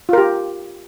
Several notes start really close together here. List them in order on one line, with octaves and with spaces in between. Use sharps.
F4 A#4 G4